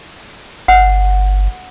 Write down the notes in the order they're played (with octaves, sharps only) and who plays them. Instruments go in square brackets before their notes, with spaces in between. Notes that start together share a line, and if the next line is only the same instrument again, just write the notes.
[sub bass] G1 [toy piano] F#5